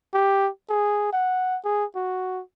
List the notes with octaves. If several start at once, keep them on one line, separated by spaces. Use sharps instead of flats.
G4
G#4
F#5
G#4
F#4